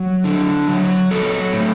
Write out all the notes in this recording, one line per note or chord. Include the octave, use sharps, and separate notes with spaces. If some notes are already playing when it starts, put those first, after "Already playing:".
Already playing: F#3
D3
F#3
F#3 A4
A2